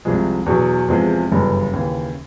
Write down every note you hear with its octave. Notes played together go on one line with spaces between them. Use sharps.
C2 C3 F3 G#3
E2 B2 F#3
E2 C3 F3 G#3
G1 F#2 C#3 E3 G3
D#2 C#3 E3